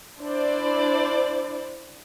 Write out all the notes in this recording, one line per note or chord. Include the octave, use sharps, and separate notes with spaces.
D4 E4 C5 D5